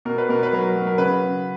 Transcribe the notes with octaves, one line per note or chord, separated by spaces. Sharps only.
B2 A#4
B4
B2 A#4
B4
F#3 A#4
F#3
A#4
C#3 B4
C#3